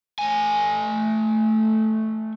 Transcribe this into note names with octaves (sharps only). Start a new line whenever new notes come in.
A3 G#5